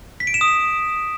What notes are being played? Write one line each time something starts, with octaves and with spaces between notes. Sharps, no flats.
B6
D7
E7
D#6
E7